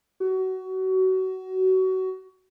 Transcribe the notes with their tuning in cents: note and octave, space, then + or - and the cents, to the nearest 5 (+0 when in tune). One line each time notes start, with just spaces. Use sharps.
F#4 +25